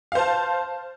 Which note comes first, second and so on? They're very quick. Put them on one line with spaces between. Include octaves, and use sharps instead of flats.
F5 C5 A5